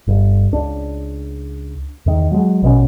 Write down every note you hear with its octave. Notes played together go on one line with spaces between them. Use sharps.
G1
C#2 D4
E2 D#3
F#3 G#3
A#1 B2 E3 C#4